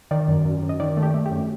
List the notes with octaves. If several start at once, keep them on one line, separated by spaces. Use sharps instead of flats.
D#3 D5
F#2
F#2
F#2
D#5
D#3 D5
A3
G4
A3
G4
F#2